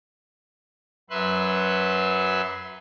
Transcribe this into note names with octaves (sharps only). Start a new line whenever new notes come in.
F#2 F#3 B4 E5 C6 F#6